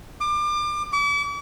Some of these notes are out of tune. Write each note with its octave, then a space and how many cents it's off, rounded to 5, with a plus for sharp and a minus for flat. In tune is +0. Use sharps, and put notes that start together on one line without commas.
D6 +30
D6 -40